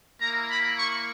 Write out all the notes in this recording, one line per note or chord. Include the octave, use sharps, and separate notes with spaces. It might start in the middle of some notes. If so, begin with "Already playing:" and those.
A#3 E4 A#5
B5
C#6